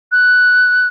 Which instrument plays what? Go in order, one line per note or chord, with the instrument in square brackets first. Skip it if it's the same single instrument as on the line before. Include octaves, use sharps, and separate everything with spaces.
[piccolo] F#6